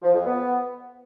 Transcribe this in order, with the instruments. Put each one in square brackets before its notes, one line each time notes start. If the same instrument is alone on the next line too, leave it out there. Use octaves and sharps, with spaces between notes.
[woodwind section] F3
F2
B3